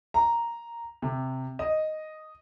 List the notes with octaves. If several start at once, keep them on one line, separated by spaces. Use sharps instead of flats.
A#5
C3
D#5